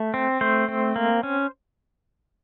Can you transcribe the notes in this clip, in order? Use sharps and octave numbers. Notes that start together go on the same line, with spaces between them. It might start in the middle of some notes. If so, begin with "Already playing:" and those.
Already playing: A3
C4
A3 C5
C4
A#3
C#4